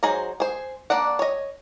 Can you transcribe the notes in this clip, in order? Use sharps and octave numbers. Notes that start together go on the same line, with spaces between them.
F#3 D#4 G#4 C5
G#4 C5
A#3 D4 D5 F#5
C#5 D#5